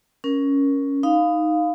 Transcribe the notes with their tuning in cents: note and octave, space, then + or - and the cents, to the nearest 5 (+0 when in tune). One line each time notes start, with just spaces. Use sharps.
C#4 +0 A#4 +15
D#4 +0 F5 +5 B5 +25